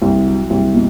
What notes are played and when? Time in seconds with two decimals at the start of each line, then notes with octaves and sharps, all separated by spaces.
0.02 C2
0.27 F#3
0.50 C2
0.74 B2